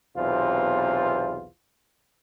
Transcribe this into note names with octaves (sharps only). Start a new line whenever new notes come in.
B1 E2 C3 F4 C5